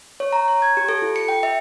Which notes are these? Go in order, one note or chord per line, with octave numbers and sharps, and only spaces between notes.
C#5
A#5
C#5
G#6
G4
A4
F4
C#7
G5
E5